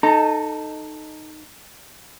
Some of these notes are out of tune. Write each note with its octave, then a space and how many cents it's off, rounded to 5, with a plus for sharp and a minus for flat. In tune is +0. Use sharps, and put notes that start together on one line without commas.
D#4 -10 A4 +0 A#5 -35